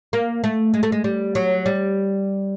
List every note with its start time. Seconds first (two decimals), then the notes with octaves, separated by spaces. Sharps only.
0.13 A#3
0.44 A3
0.74 G#3
0.83 A3
0.92 G#3
1.04 G3
1.35 F#3
1.66 G3